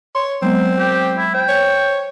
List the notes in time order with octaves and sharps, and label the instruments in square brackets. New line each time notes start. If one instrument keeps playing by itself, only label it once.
[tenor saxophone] C#5 [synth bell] C6
[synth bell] F#3 G#3 B3 [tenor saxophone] C4
[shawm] G4
E4
[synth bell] C5 [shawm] G5
[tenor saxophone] C#5